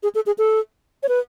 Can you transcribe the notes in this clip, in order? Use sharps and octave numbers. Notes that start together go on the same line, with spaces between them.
G#4
A4
G#4
A4
C#5
B4